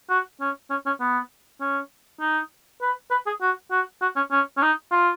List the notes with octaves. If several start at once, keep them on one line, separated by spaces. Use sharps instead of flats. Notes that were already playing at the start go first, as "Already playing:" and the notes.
F#4
C#4
C#4
C#4
B3
C#4
D#4
B4
B4
G#4
F#4
F#4
F#4
C#4
C#4
C#4
D#4
F4